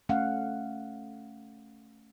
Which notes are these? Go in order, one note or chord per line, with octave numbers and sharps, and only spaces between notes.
A3 C#4 F5 F#5